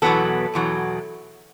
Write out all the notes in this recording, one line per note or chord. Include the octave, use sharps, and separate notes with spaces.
E2 B2 F#3 B3 A4
E2 B2 F#3